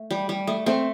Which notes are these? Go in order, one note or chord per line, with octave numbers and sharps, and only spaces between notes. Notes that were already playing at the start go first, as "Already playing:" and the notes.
Already playing: A3
G3
G3
A3
A3 C4